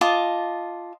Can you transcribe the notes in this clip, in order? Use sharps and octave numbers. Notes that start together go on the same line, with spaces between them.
F4 D#5 A5 D6